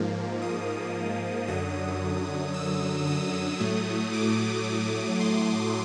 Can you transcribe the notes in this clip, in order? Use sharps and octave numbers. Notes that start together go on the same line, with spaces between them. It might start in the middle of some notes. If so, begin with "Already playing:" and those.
Already playing: G#2 F3 A#3
D#6
F#2 D3 F#3 D#6
E6
D#6
A2 F#3 A3
D6
C6